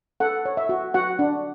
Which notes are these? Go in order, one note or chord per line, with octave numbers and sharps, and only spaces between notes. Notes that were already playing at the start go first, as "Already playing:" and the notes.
A4 F#5
C#5
E5
F#4
F#4 F#5
D4